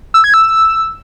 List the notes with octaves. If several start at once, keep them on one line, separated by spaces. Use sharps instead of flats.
E6
G#6
E6